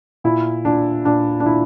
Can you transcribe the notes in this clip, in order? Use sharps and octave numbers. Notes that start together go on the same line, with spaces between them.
A#2 E4
A#2 D4
A#2 D4
D4
A#2 E4